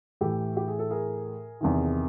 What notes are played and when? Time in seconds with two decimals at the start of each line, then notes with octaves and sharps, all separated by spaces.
0.21 A2 E3 G4 A4
0.57 G4
0.68 G#4
0.79 A4
0.91 G#4 A#4
1.61 E2 C3 D#3